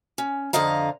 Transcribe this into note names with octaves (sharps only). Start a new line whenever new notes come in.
C#4
F2 D3 D#5 F5 A#5